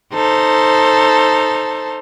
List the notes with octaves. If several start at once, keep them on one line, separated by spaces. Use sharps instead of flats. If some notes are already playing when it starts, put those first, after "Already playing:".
D#4 A4 C5